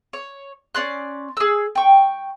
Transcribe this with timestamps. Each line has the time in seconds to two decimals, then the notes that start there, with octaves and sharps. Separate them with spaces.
0.13 C#5
0.75 C#4 D5 C6 F#6
1.37 G#4 E6
1.75 G5 C#6